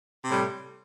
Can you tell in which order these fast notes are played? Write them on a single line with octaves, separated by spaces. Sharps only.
C3 A2 G3